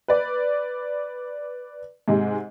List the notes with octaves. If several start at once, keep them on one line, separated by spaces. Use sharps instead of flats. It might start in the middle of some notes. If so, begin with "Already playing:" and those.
B4 D5
G#2 C3 G#3